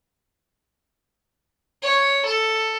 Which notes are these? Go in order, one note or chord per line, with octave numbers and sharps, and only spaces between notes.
C#5
A4